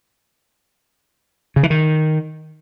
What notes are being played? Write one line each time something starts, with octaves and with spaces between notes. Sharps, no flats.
C#3
E3
D#3